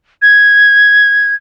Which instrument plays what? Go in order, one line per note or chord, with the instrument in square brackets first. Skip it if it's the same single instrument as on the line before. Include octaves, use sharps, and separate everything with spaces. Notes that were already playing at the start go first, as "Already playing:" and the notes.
[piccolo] G#6